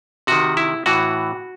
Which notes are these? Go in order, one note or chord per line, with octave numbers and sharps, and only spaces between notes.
C3 D#3 F#4
E4
A2 E3 F#4